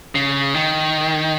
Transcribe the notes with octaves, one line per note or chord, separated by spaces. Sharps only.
C#3
D#3